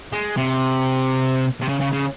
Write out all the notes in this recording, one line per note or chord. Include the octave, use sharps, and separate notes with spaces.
G#3
C3
C3
C#3
C#3
C#3